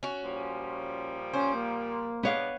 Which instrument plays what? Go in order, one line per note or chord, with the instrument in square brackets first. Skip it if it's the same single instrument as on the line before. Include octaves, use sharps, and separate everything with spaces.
[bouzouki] C#4 F#4
[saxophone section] A#2 F3 G3
[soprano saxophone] C#4 [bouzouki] C5
[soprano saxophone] A#3
[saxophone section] B2 G#3 D4 [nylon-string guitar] B3 C#5 F5